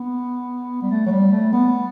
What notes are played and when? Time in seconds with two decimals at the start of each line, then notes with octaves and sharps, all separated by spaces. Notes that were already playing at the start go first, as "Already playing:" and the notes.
Already playing: B3
0.82 G3
0.91 A3
1.06 F#3
1.11 G3
1.32 A3
1.53 B3